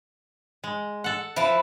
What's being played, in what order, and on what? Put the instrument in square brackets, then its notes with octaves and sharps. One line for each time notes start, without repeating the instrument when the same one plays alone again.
[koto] G#3
A4 F#5
[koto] F3 [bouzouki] E4 B4